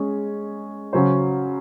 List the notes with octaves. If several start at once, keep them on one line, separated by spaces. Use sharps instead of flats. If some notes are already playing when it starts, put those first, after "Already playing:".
Already playing: G#3 C#4 G#4
C#3 F#3 C#4 F#4 C5